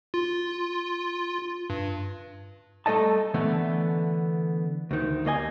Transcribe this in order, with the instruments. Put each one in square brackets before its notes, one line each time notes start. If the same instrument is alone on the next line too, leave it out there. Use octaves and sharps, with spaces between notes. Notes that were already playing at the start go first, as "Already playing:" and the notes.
[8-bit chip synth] F4
G2
[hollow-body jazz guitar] G3 A3 A4 D#5 A5
D3 E3 A3 B3
D2 D#3
D#2 A#3 D#5 G#5